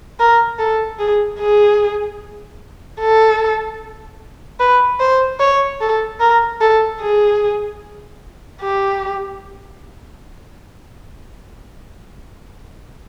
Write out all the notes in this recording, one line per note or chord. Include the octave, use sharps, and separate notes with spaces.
A#4
A4
G#4
G#4
A4
B4
C5
C#5
A4
A#4
A4
G#4
G4